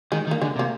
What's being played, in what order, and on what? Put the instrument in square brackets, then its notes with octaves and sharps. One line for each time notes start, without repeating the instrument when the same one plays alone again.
[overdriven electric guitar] D#3 [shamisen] G#3
[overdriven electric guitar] D#3
[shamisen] A#3
[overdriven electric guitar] D3 [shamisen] G#3
[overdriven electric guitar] C3
[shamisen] A#3